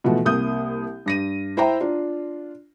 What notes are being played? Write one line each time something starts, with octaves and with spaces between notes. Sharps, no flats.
B2 E3 F3 A3 F#4
C2 A#3 D#6 G6
G2 A#6 D#7
E4 C5 E5 G5 A#5
D4 F4